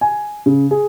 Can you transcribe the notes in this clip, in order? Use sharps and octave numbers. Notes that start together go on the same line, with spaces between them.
G#5
C#3
G#4